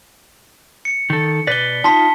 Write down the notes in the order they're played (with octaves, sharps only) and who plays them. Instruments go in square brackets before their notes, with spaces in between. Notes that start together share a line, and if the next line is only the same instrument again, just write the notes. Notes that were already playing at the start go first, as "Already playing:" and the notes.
[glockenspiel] C#7
[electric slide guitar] D#3 A4
[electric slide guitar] B2 B4 D5 [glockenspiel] B6 G7
[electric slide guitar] D#4 F4 [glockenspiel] A5 C6 B6